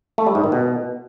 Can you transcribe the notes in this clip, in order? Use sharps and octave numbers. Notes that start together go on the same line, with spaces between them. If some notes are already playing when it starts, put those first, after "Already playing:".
A3
G3
G#2
D#3
B2